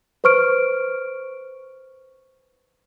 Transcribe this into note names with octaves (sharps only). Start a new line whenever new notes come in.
B4 C5 C#6 F6 D7